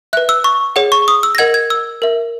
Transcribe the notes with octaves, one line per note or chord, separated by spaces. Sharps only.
B4 E5 F#6
E6
C#6
G#4 C#5 F#5
C#6
D#6
E6
A#6
A#4 D#5 F#5 G#6
G#6
E6
A#4 E5